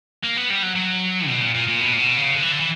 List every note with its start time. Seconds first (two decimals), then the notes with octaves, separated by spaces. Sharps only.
0.24 A#3
0.37 B3
0.50 G3
0.63 F#3
0.76 F#3
1.28 B2
1.42 A#2
1.55 A#2
1.68 A#2
1.81 B2
1.93 A#2
1.98 B2
2.17 C#3
2.34 D3
2.42 E3
2.52 D3
2.60 E3